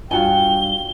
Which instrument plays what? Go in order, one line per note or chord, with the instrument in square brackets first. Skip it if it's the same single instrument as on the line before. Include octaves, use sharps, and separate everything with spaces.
[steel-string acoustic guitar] G2 [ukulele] F4 F#4 G#5 [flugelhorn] G5 [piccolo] G7